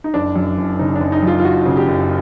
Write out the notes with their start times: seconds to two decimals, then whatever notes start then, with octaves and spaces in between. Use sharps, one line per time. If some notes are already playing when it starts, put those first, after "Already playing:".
0.04 D#4
0.14 F#1 D4
0.36 F#2
0.57 F#1
0.79 C#3 D#4
0.96 F#1 D4
1.12 D#4
1.23 F#2 F4
1.39 F4
1.44 F#1 F#4
1.65 C#3
1.77 G4
1.87 F#1